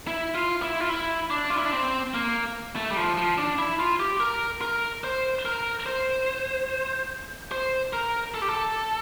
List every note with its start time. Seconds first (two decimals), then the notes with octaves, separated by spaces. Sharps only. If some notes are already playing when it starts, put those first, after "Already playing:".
0.07 E4
0.35 F4
0.62 E4
0.80 F4
0.89 E4
1.30 D4
1.50 F4
1.57 E4
1.65 D4
1.72 C4
2.14 A#3
2.76 A3
2.90 G3
2.97 F3
3.17 F3
3.38 D4
3.58 E4
3.79 F4
4.00 G4
4.20 A#4
4.61 A#4
5.04 C5
5.45 A#4
5.86 C5
7.52 C5
7.93 A#4
8.34 A4
8.42 G4
8.49 A4